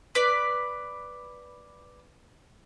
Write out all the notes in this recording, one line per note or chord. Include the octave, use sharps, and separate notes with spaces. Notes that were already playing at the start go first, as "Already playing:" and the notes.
B4 D5